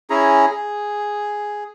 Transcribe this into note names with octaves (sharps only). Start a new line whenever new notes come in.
C#4 E4 G#4 A#5
G#4